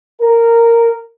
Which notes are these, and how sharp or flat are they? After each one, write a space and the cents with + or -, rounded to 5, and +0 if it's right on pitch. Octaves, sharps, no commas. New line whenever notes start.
A#4 -10